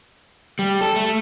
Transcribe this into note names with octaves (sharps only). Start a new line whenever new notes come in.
G3
A4
A3